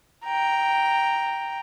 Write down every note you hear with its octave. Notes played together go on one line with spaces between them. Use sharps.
G5 A#5